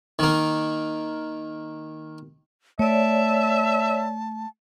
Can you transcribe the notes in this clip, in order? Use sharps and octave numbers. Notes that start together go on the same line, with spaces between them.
D#3 A#3
A3 C#5 D5 E5 A5